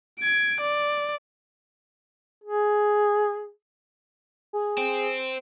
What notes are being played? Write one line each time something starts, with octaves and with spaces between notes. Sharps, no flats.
G#6 D7
D5
G#4
G#4
C4